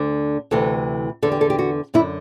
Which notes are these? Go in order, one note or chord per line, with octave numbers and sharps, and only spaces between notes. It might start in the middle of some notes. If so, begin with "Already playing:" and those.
Already playing: D2 D3
D2 C3 E3 A4
E2 D3 A4
G4
A4
G4
F#4
F#2 D3 E4